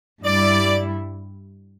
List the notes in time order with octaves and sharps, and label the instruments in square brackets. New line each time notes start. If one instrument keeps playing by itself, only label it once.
[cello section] G2 G3 E4 [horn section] D5